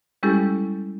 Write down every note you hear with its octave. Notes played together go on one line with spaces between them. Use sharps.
G3 G#3 C#4 E4 G4 A4